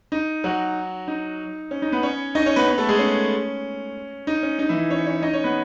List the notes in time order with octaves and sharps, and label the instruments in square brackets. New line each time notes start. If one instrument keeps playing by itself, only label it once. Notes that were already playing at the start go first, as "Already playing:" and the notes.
[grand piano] D#4
F#3 F#4
D#4
C#4
D#4
B3 B4
C#4 C#5
D#4 D#5
C#4 C#5
B3 B4
B3 B4
A3 A4
G#3 G#4
C#4
D#4
C#4
D#4
E3 E4
C#4 C#5
C#4 C#5
D#4 D#5
C#4 C#5
B3 B4